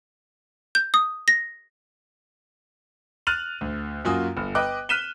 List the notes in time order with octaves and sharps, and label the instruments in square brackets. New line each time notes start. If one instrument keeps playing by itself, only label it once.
[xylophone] G6
D#6
A#6
[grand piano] F6 F#6 A6 D#7 F7 F#7
D2
F#2 A#3 F4 F#4 G#5 D#6
G1
B4 D#5 G5 D6 F#6
F6 F#6 B6 D#7 E7 G7